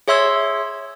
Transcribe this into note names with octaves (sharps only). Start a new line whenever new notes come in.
G#4 C#5 E5 C6 E6 G#6